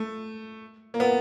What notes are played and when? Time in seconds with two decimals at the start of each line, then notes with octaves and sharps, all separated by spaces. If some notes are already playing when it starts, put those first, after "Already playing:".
Already playing: A3
0.94 A#3
1.00 B3